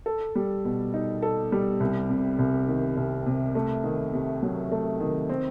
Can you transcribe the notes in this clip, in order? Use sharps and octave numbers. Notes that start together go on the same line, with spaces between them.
A4
G3
B2
D#4
A4
G3
C2
C3
C2
D#3
C2
C3
A3
D#3
C3
F#3
A3
D#3
C4